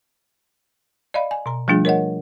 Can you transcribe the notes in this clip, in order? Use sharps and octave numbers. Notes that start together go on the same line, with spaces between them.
D5 D#5 F5 B5
G#5
B2 A#5
F3 G3 A3 D4 F4 G#4
A#4 C#5 D#5 F#5